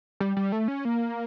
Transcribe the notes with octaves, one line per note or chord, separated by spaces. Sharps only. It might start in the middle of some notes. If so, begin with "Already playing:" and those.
G3
G3
A3
C#4
A#3